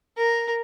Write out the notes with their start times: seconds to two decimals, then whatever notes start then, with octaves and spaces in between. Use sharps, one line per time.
0.17 A#4